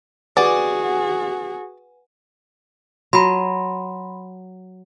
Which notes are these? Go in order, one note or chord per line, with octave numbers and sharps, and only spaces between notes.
F#4 G#4 B4 D5 F#5 G#5
F#3 B5 C6